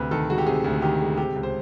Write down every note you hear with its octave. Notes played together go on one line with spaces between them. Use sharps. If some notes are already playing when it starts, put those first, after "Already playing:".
Already playing: D2 C3 B4
D#3 A4
G#3 F#4
G4
C3 G#4
D2
D#3 G4
G#3
C3 G4
C#2
C5